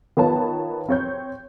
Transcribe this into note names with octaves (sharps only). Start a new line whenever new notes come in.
D#3 B3 F4 C#5 A5
C4 C#5 G6